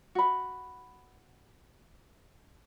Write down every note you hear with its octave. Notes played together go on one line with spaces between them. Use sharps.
F#4 B5